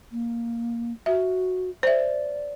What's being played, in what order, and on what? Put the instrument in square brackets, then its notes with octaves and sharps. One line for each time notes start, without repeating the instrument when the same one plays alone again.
[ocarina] A#3
[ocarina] F#4 [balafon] E5
[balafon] C5 E5 [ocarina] D5